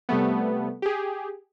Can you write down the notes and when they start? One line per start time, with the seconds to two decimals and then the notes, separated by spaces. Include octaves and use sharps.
0.09 C3 G3 A3 B3
0.82 G4 G#4